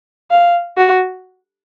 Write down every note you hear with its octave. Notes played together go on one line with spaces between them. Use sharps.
F5
F#4